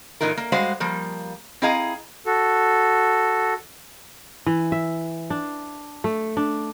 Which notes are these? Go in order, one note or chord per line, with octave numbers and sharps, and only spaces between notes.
A#2 E3 D#4 F4 A#4
A#3
G3 G#3 F#4 C5 F5
F3 G3 A#3
C4 E4 G#4 D#5 F5 A#5
F#4 A4
E3
E5
D4
A3
D4